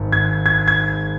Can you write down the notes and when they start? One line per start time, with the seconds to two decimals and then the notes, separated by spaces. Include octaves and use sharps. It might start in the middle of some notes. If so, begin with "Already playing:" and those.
Already playing: G#1 G#2
0.12 G#6
0.46 G#6
0.68 G#6